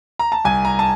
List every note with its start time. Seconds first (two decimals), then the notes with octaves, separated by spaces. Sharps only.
0.19 A#5
0.32 A5
0.44 C2 G#5
0.65 A#5
0.79 A5